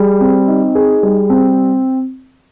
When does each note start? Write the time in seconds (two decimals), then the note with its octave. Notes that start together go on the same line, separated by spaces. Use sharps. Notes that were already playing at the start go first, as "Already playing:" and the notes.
Already playing: G3 G#4
0.21 C4
0.48 D#4
0.75 G#4
1.03 G3
1.30 C4